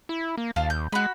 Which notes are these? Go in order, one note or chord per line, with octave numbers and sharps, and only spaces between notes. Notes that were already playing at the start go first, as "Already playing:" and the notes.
E4
A#3
D#2 F4 F5 A5
G6
G#3 F#4 B5